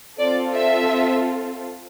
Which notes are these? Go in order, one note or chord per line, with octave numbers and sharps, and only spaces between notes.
C4 F4 A4 D5
E5